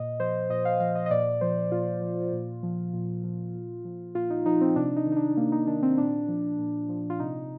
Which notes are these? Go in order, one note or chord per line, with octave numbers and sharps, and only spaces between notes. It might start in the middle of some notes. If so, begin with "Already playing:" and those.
Already playing: A#2 D#5
F3 C5
A#2 D#5
F5
F3 F5
D#5
D#5
A#2 D5
F3 C5
A#2 F4
F3
A#2
F3
A#2
F3
A#2
F3
A#2 F4
D#4
F3 D#4
C4
C3 D4
D#4
D#3
D#4
D4
C3 A#3
D#4
D#3 D4
C4
A#2 D4
F3
A#2
F3
F4
C3 D#4